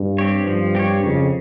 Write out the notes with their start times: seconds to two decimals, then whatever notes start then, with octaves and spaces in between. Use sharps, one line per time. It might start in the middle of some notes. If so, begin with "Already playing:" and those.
Already playing: G2
0.18 C4 G4 C#5
0.47 G2 F3
0.75 C4 G4 C#5
1.03 F2 C#3